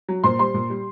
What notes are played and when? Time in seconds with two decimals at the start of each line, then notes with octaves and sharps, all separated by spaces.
0.09 F#3
0.23 A#2 C5 C6
0.39 G3 C5 C6
0.54 A#2
0.70 G3